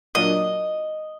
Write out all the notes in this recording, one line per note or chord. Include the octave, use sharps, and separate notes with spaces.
A#2 F#3 A#3 D4 D#5